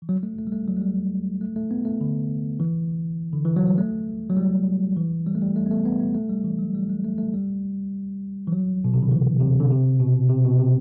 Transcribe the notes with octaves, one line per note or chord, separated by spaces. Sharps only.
E3
F#3
G3
A3
A3
G3
A3
F#3
A3
G3
A3
A3
B3
A3
D3
E3
D3
E3
F#3
G3
A3
F#3
G3
E3
G3
A3
G3
A3
B3
A3
B3
B3
A3
G3
E3
F#3
G3
A3
A3
A3
G3
E3
F#3
B2
C3
D3
E3
C3
D3
C3
B2
C3
B2
C3